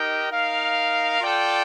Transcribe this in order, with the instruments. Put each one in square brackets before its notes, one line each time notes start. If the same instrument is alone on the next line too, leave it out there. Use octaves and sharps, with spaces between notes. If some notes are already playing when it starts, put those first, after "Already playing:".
Already playing: [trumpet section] D#4 G4 A#4 D#5 G5
D#4 A#4 F5
F4 A4 D5 G5